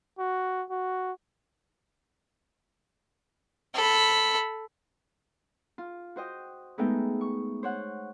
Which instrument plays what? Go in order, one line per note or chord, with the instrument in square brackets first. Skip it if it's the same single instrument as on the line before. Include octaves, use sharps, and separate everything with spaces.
[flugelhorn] F#4
F#4
[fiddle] A4 B5
[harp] F4
F#4 C5 D#5 G5
G#3 A3 B3 D#4 E5 G5
C#6
C5 C#5 F#5